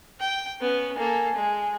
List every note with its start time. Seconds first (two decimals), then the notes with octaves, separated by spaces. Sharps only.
0.20 G5
0.60 B3 C#4
0.98 A#3 A4 G#5
1.35 G#3